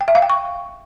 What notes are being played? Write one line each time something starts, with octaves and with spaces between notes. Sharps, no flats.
G5
E5
F5
G5
C#6